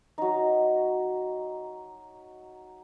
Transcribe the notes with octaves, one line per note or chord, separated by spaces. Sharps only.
F#3 D#4